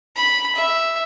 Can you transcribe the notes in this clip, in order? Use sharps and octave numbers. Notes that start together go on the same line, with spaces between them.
B5
E5